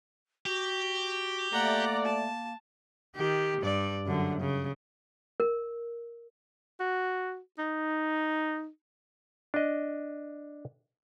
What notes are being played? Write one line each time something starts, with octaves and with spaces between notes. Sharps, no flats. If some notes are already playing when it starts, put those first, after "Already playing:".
F#4 G4
A3 A#3 D5 F#5 A#5
A5
D#3 G4
G2 D5
F#2 D3
C#3
A#4
F#4
D#4
D4 D#5